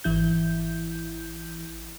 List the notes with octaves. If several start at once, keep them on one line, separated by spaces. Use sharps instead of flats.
G#1 E3 E4 G6